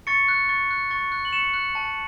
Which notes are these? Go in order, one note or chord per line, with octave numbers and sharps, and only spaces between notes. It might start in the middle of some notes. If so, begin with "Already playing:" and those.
C#6 A6 C#7
F#6
C#6 A6
F#6
C#6 A6
F#6
F#7
C#6 C#7 E7
F#6
A5